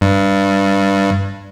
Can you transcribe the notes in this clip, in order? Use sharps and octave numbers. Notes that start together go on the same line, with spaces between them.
G2